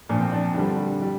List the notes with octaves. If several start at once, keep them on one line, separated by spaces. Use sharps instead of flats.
A#2 F3 D4
C4
D4
G2 D3 G3
G3